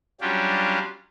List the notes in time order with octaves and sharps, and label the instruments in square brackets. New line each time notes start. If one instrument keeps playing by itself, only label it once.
[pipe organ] F#3 G3 C#4 D4 F4 G4